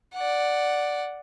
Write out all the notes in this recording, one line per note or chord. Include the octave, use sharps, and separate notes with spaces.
D5 F#5